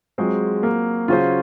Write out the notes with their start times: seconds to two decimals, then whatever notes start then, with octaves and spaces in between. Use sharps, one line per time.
0.18 F#3 G#3 C4 F4 G#4 C5
0.63 A#3
1.08 C#3 F#3 C#4 F4 G#4 C5